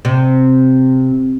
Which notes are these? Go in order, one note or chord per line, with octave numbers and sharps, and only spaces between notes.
C3